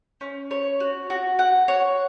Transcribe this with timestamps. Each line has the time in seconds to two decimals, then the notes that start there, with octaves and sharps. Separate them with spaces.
0.21 C#4
0.51 C#5
0.80 F#4
1.10 F#4
1.39 F#5
1.68 C#5